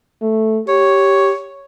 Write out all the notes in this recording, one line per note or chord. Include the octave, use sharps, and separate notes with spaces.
A3
G4 C#5